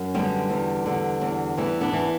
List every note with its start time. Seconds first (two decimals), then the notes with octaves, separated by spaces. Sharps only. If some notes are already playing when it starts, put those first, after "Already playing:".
Already playing: F#2
0.14 D3 G3 B3
0.50 E2
0.86 D3
1.21 E2
1.57 E3 G3 B3
1.81 B3 D4
1.93 E3